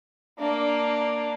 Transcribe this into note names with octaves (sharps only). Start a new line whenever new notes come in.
A#3 D4